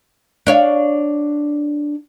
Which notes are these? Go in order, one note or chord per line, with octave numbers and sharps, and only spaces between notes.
D4 C#5 F5